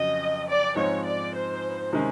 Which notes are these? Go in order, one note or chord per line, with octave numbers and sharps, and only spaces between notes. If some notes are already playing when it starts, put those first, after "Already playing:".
Already playing: F2 C#3 F#3 D#5
D5
G#2 F3 G#3 C4 D#4 C#5
D5
C5
C3 D#3 G#3 C#4